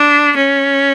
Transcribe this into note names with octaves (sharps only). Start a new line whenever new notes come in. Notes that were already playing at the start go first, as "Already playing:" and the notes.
Already playing: D4
C#4